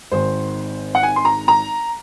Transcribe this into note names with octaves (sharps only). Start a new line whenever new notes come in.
G#1 G#2 D#3 C5
F#5
G#5
C6
A#5
A#5